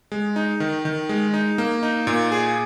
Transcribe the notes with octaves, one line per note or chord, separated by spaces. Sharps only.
G#3
D#4
D#3
D#3
G#3
D#4
A#3
D#4
A#2
G#4